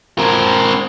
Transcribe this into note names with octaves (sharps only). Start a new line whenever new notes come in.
C4 A#4